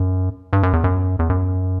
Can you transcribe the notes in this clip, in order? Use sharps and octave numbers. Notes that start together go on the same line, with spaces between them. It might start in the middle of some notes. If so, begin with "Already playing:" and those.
Already playing: F#2
G2
F#2
E2
F#2
E2
F#2